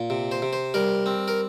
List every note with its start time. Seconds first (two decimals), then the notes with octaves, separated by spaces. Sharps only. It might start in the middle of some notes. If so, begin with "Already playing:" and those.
Already playing: A#2
0.10 C3
0.32 C5
0.42 C3
0.53 C5
0.74 G3 A#4
1.06 C4
1.28 A#4